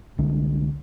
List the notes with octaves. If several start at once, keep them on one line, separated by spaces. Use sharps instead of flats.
C2 D3 G#3